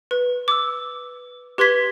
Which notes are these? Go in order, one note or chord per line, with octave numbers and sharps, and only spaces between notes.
B4
D6 E6
G4 B4 C6 G#6 B6 G7